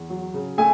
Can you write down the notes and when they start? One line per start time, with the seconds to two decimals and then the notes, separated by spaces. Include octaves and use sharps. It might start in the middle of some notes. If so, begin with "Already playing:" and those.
Already playing: E2
0.10 F#3
0.34 C#3
0.58 A3 G#5